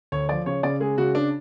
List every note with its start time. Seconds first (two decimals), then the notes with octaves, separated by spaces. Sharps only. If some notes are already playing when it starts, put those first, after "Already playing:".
0.12 D2 C#5
0.29 F3 D5
0.46 C#3 C#5
0.63 C#3 D5
0.80 G#3 G#4
0.98 C#3 F#4
1.15 D4